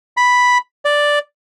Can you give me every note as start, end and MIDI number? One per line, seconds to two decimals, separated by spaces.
0.17 0.58 83
0.85 1.19 74